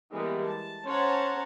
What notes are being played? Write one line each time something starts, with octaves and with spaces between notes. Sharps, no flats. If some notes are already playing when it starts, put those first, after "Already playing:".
E3 G3 G#3 A#3 B3
A5
C#4 C5 C#5 F#5 A5 A#5